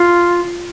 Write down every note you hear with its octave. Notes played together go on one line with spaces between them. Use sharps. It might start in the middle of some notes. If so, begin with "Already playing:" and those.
Already playing: F4